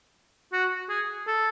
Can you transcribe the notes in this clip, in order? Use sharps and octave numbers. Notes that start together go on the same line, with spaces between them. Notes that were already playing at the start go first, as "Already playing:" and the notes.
F#4
G#4
A4